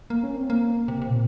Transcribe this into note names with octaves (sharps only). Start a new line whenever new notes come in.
A#3
C#4
C4
A#3
C3
C3
A#2